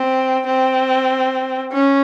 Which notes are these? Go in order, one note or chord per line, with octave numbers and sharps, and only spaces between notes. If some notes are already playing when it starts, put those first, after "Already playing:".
Already playing: C4
C4
C#4